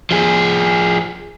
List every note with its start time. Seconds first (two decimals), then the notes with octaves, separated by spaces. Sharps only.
0.11 F3 G#4